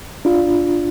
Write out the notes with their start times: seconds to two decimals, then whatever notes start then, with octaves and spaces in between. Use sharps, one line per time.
0.25 D4 F4